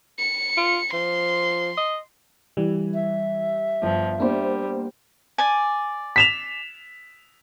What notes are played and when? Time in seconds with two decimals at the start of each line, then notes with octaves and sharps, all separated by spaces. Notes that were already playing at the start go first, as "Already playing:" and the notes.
0.19 C#7
0.57 F4
0.93 F3 C6
1.77 D#5
2.57 E3 G3
2.94 E5
3.83 G1 F3
4.20 G3 A#3 B3 D4 C5
5.38 D5 G#5
6.16 B6 E7 F7